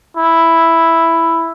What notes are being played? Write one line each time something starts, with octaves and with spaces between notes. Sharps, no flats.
E4